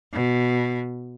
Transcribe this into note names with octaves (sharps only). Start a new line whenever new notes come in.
B2